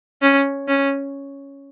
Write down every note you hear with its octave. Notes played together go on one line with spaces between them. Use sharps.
C#4
C#4